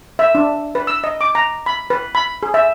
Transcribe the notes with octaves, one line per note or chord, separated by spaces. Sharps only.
E5
D4
B4
E6
D#5
D6
A#5
B5
B4
B5
G#4
E5